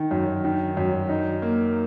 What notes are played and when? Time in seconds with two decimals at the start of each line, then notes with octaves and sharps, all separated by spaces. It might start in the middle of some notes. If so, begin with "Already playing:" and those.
Already playing: D#3
0.11 F#2
0.45 D#3
0.77 F#2
1.09 D#4
1.42 A#3